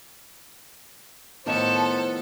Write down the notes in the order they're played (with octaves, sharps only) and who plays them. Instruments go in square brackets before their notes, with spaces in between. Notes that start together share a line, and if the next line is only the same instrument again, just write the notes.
[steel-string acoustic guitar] A2 D#3 F3 [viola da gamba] B3 A4 [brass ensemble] C5 [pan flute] A5